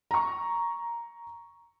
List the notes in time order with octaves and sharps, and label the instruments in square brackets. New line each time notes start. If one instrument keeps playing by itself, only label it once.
[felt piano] A#5 C#6